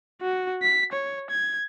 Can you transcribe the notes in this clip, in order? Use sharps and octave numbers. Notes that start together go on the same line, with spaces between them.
F#4
B6
C#5
G#6